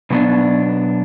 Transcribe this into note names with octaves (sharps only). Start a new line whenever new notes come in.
B2 F#3 B3 D4